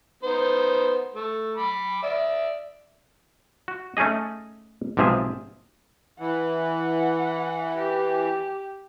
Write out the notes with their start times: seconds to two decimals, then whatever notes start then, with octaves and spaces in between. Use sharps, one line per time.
0.23 B3 D#4 C5
1.14 A3
1.57 B5 D6
2.03 D5 E5
3.68 F#4
3.97 A3 C#4 D#4 G#4 D#5
4.97 B1 G#2 C3 F3 G#4 E5
6.20 E3 F#5
7.77 G4